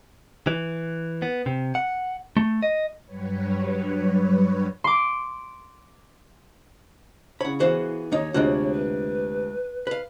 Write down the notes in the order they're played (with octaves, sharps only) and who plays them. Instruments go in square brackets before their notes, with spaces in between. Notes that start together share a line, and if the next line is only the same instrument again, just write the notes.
[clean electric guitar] E3
B3
C3
F#5
A3
D#5
[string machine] G2 F#3 G3 B4 C#5
[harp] C6 D6
[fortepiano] C#3 C#5 [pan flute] E4 [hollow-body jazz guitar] F#5 B5
[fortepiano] E3 B3 G#4 [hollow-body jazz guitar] F#4 C5 F5
[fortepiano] D#2 [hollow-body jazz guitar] A#3 D#4 [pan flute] C#5
[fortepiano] D2 C3 F#6 [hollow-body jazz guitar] G#3 F4 F#4
[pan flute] B4
[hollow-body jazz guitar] B4 F5